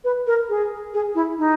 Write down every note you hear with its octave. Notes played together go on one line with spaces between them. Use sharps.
B4
A#4
G#4
G#4
E4
D#4